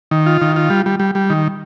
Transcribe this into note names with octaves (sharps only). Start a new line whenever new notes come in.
D#3
F4
D#3
F4
G3
G3
G3
G3
D#3